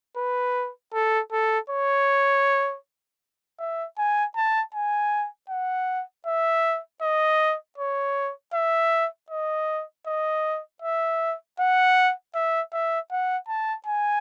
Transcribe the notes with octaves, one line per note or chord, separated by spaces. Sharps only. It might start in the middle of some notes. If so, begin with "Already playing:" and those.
B4
A4
A4
C#5
E5
G#5
A5
G#5
F#5
E5
D#5
C#5
E5
D#5
D#5
E5
F#5
E5
E5
F#5
A5
G#5